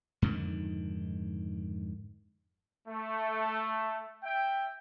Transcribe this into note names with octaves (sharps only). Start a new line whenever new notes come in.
F2 G#2 D3 D#3
A3
E5 G5